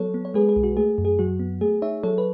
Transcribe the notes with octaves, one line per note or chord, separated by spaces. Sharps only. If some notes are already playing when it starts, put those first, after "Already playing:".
Already playing: F#3 B3 A4 C#5
B3
C#5
G#3 G#4 B4
G#4
B1
F#4
A3 G#4
F#2
G#4
F#3 F#4
B3
A3 G#4
D#4 C#5 E5
F#3 A4 C#5
B4